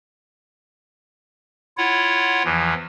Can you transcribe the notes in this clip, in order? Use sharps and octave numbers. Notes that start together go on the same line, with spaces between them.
E4 F4 C#5 F#5
E2 E3 F3